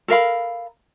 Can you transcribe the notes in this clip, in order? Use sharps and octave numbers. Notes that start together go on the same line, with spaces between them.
A4 A#4 F5 B5